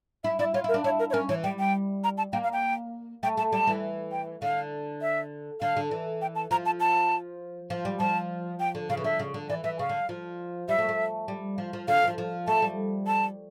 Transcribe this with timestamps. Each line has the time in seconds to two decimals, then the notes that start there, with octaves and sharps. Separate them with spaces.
0.24 E4 E5
0.39 E4 D5
0.54 F4 C#5
0.64 E4 A#4
0.74 D4
0.84 E4 C#5
0.99 A#4
1.10 C#5
1.13 C#4 A#4
1.29 E3 C#5
1.44 G3 G5
1.59 G5
2.04 A#5
2.18 A5
2.33 A#3 G5
2.44 F5
2.53 G5
3.23 A3 G5
3.37 A3 A5
3.52 G3 A5
3.67 E3
4.12 G5
4.42 D3 F5
5.02 E5
5.61 D3 F5
5.77 D3
5.91 E3
6.22 G5
6.35 A5
6.51 F3 A#5
6.66 A5
6.80 A5
7.70 F3
7.85 G3
8.00 F3 A5
8.60 G5
8.75 D3
8.89 C#3 F5
8.97 E3
9.04 D3 E5
9.19 C#3
9.34 D3
9.49 E3 D5
9.64 E3 E5
9.79 C#3 F5
9.89 D3
10.09 F3
10.69 G3 E5
10.78 A3
10.89 A3
11.28 G3
11.58 F3
11.73 F3
11.88 D3 F5
12.04 E3
12.08 F3
12.18 F3
12.47 A3 A5
12.62 G3
13.07 A5